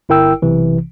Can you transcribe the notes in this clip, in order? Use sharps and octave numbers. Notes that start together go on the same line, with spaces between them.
G1 E4 A#4 G5 E6
B1 C3 E3